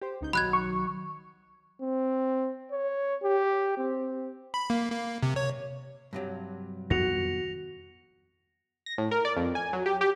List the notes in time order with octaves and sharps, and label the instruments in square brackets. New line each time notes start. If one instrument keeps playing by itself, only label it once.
[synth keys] G4 C5
C#2 D#4 G6
[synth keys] B1 D#3 F#3 [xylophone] B5 F#6 G#6
[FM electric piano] C#6
[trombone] C4
C#5
G4
C4
[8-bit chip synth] B5
A#3
A#3
C3
C#5
[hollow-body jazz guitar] G2 C3 F#3
[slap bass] F2 D#3 B3 [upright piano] F#4 [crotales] A#6 C#7 F7
[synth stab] A#6
A2
A#4
D5
F2
G#5
F#3
G4
G4